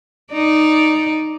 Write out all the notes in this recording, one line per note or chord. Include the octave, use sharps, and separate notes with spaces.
D#4 D5